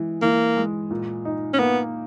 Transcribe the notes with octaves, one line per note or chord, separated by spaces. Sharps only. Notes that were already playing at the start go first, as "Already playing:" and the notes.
Already playing: E3 G#3
E3 A#3
G#3
A#2
D#4
C#4
A#3 B3